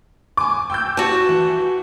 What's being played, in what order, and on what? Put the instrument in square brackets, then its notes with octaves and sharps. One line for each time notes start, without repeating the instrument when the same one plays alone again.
[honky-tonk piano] G#5 D6
G5 E6 G6
[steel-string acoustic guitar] F#4 A5 [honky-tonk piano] G4
[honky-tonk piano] E3